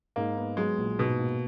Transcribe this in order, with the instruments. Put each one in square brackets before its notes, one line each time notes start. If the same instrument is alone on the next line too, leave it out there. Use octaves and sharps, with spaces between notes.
[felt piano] G#2 [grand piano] A#3
[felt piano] B3
[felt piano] F#3 [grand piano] G#3
[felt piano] A#1
[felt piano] G#2 [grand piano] B2
[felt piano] A#3